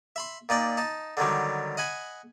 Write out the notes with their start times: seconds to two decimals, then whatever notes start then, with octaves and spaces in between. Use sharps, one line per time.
0.16 E5 B5 C6
0.49 A#2 D#4 D5 G5
0.77 D#4 A5
1.17 D3 D#3 F#3 G3
1.77 D#5 F#5 G#5 B5